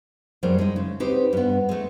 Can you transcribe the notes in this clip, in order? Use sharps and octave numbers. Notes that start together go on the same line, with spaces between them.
F#2 G3 A3 G#4 A#4 C5
G#3 D#4
C#3
C4 D#4 G4 B4 C5
G2 B3
G#3 A3